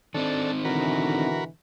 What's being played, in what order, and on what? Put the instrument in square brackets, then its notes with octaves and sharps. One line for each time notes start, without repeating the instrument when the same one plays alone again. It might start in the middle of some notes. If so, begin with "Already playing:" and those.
[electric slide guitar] D#3 C4 D#4 [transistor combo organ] D4 A4
[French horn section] B2 D3 E3 [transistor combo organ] F#4 A#4 B5